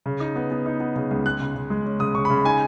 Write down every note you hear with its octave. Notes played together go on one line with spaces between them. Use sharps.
C#3
D#4
B3
B3
D#4
B3
C#3
C#2
G#3 F#6
C#3
C#3
G#3
C#4
C#3 D#6
C#3 C#6
B5
C#3
D#4 G#5